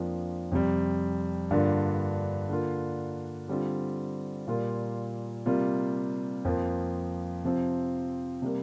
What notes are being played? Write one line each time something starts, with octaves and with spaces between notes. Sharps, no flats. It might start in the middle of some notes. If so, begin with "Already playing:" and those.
Already playing: F2 F3 A#3 D4 F4
F2 C3 G3
G2 D3 A#3 F4
D3 A#3 F4
D3 G3 C4 F4
A#2 G3 A#3 F4
C3 G3 A#3 F4
F2 F3 A#3
C3 F3 C4
C3 G3 A#3